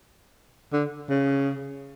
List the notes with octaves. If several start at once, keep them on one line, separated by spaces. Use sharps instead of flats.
D3
C#3